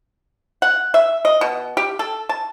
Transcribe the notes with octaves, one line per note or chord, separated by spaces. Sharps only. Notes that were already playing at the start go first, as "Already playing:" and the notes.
F#5
E5
D#5
B2
G4
A4
A5